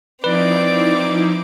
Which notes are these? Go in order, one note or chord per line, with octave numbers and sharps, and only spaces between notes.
F3 C4 D#4 E4 B4 D5 D6